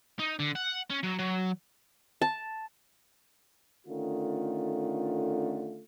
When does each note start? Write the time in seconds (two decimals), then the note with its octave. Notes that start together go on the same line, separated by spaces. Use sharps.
0.19 D#4
0.39 D3
0.55 F#5
0.90 C#4
1.03 F#3
1.19 F#3
2.22 A5
3.87 D3 D#3 A3 C#4 F4